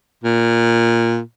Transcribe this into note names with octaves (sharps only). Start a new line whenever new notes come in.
A#2